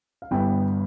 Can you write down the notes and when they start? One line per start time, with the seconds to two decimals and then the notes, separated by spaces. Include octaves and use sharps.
0.22 F5
0.31 G1 G2 E3 G3 B3 G5